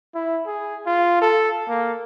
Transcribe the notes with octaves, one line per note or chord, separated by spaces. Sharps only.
E4
G#4
F4
A4
A#3